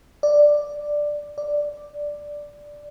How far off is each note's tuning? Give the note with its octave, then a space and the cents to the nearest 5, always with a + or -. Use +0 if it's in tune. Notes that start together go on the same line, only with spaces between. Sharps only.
D5 +5
D5 +0